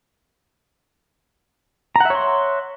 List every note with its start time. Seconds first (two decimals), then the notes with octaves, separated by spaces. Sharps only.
1.96 A#5
2.00 F#5
2.05 E5
2.10 C#5
2.15 C6